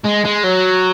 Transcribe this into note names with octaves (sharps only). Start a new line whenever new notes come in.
G#3
G#3
F#3